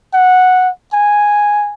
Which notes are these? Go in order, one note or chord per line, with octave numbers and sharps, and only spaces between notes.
F#5
G#5